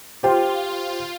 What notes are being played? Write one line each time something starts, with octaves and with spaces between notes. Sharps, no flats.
F4 G4 C5 G5